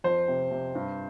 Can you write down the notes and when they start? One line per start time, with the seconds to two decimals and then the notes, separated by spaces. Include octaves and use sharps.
0.04 F2 C5
0.28 C3
0.51 C3
0.75 G2